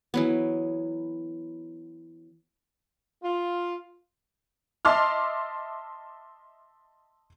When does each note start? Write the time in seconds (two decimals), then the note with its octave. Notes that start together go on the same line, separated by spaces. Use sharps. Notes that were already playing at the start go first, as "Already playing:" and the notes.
0.14 E3 F#3 B3
3.23 F4
4.85 D#5 E5 A5 C6 D6 F6